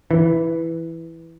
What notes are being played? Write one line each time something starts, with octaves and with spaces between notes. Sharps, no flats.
E3